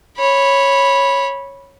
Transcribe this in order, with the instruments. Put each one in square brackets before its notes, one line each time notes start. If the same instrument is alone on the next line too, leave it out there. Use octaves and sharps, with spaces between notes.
[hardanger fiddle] C#5 B5